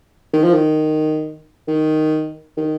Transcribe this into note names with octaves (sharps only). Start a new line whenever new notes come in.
D#3
F3
D#3
D#3
D#3